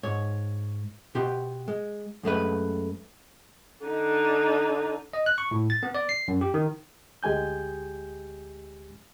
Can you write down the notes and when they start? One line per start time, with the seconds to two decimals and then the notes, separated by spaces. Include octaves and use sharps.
0.03 G#2 C#5
1.15 B2 B3 G4 C6
1.68 G#3
2.23 F#2 G#3 A3 B4
3.86 D3 D#4
5.13 D#5
5.26 F#6
5.38 C#6
5.51 A2
5.70 A6
5.83 B3
5.94 D5
6.09 C7
6.28 F#2
6.41 G4
6.54 D#3
7.23 D2 G#3 G4 G#5 G6